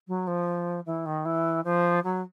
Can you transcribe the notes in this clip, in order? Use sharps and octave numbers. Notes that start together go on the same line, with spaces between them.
F#3
F3
E3
D#3
E3
F3
F#3